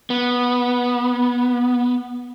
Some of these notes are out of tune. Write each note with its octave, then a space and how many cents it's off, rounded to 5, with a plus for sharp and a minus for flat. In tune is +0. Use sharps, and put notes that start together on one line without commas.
B3 -10